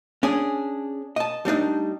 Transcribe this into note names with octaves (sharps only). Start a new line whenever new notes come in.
C#4 D4 G#4
D#5 A5
G3 A3 D4 D#4